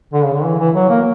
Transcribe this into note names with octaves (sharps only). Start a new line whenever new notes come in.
D3
C#3
D3
E3
E3
F#3
A#3